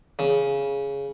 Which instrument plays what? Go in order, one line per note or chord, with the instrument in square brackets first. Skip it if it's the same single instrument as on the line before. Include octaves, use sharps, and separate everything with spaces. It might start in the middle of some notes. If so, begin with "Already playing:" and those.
[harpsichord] C#3